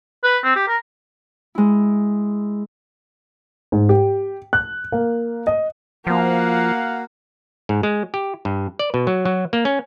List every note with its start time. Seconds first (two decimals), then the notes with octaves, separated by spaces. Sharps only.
0.24 B4
0.44 C4
0.56 G4
0.68 A#4
1.55 G#3 E4
3.72 G#2
3.89 G4
4.53 F#6
4.92 A#3
5.47 D#5
6.07 F3 A#3 F#4 F5 F#5
7.69 G#2
7.83 G#3
8.14 G4
8.45 G2
8.79 D5
8.94 B2
9.07 F#3
9.25 F#3
9.53 A#3
9.65 C#4